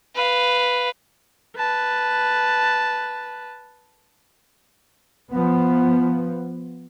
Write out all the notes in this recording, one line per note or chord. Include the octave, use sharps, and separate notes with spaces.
B4 F5
B4 A5
F3 B3